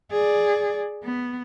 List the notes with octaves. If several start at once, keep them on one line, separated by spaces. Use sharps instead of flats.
G#4 D5
B3